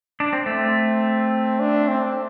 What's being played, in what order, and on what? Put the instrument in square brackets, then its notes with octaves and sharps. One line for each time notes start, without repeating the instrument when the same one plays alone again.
[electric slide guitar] D4
C4
[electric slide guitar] A3 [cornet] C4
[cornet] D4
C4